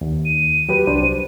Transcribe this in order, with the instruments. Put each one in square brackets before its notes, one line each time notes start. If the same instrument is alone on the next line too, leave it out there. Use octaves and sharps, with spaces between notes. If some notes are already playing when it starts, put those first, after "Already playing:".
[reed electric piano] D#2
[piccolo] D#7
[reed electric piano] F#3 G4 B4
C2 D4 C5